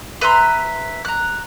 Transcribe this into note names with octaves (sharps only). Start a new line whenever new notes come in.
B4 E5 A#5 C6
A#5 F#6